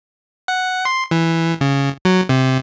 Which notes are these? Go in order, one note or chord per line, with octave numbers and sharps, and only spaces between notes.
F#5
C6
E3
C#3
F#3
C3